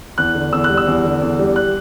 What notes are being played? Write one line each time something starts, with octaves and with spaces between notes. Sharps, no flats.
E2 F#6
D3
E2 E6
F#6
G3
E6
E2
D3
E2
G3
F#6